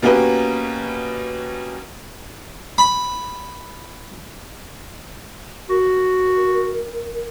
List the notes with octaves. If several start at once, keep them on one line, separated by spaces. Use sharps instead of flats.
B2 A#3 C#4 F#4 G4 B4
B5
F#4 A#4